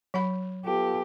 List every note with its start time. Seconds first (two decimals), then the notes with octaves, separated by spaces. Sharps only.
0.14 F#3 F#5 B5
0.65 B3 F4 G4 A4